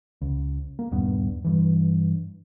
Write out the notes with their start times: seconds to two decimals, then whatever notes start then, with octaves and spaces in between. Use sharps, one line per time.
0.22 C#2
0.79 A#3
0.92 D#1 G2 B3
1.45 G2 E3